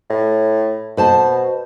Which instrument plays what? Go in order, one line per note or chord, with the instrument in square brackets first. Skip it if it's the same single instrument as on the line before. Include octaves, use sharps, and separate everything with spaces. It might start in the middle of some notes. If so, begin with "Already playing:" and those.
[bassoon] A2
[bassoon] B2 [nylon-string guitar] B4 C5 A5